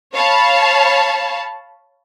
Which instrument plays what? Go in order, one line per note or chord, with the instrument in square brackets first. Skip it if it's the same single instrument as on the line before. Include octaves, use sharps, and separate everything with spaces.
[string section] C#5 F5 A5 B5